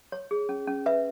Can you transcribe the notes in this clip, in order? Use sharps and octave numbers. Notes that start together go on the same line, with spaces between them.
C#5
G#4
C#4
C#4
B4 E5